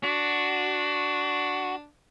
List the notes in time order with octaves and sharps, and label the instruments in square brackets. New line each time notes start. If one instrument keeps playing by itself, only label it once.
[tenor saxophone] D4 [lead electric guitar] F#4